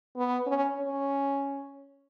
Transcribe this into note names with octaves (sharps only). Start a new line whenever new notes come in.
B3
C#4
C#4